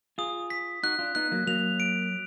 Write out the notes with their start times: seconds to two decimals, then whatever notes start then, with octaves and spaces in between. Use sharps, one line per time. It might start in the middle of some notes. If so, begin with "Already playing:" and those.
0.18 F4 G#4 D#6
0.50 B6
0.83 D#4 F#4 F#6
0.99 D4 F4
1.15 B3 D#4 F#6
1.32 F#3 A#3
1.47 F#3 A#3 F7
1.80 D7